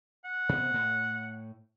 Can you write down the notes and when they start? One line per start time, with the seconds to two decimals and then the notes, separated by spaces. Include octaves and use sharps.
0.24 F#5
0.49 C3 B3
0.74 A2